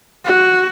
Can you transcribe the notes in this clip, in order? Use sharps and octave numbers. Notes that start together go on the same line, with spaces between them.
F#4